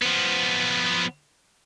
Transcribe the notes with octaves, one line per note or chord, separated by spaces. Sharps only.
F3 B3